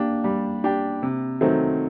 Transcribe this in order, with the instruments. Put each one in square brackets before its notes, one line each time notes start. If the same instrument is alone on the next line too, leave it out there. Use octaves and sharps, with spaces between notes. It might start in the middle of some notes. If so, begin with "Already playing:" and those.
Already playing: [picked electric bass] A#3 [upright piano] D4 G4
[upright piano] G3
D4 G4
C3
D#3 F#3 A3 C4